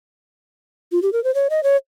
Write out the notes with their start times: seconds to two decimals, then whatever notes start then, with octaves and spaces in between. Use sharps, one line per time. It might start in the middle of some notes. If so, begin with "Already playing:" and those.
0.92 F4
1.02 G4
1.13 A#4
1.24 C5
1.35 C#5
1.50 D#5
1.63 C#5